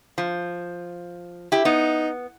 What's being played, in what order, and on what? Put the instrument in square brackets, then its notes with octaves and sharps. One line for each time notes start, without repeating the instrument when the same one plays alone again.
[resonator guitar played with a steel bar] F3
E4 G4
[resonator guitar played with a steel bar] B3 [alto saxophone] D#4